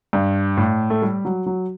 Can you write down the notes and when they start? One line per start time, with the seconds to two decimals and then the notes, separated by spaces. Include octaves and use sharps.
0.13 G2
0.57 A2
0.90 A3
1.02 G3
1.25 F#3
1.46 F#3